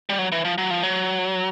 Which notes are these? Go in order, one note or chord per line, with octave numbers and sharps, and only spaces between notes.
G3
F#3
E3
F3
F#3
F3
F#3